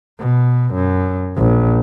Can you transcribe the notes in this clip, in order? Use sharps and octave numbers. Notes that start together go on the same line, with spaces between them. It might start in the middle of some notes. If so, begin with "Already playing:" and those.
B2
F#2
A#1